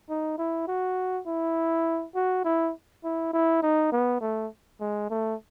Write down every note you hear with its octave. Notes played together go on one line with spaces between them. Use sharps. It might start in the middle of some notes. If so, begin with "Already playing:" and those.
D#4
E4
F#4
E4
F#4
E4
E4
E4
D#4
B3
A3
G#3
A3